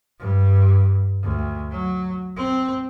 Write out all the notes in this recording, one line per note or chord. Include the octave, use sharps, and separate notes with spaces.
G2
D2
F#3
C4